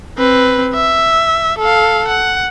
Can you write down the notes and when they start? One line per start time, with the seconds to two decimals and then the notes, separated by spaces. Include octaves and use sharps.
0.18 C4 B4
0.74 E5
1.59 A4 F5
2.08 F#5